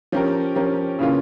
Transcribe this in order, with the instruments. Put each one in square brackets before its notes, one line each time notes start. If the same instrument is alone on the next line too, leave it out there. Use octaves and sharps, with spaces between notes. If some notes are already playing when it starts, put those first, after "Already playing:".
[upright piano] F3 C#4 G4 A#4
F3 C#4 G4 A#4
C#3 E3 A#3 C#4 F4